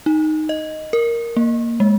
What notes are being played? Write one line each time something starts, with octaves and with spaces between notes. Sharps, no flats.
D#4
D#5
A#4
A#3
G#3